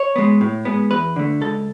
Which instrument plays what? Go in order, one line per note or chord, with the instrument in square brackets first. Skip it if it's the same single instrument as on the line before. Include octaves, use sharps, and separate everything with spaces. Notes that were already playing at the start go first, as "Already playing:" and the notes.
Already playing: [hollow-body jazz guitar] C#5
G#3 B3
A2
G#3 B3
E2 B4
D3 A3
C#2 A4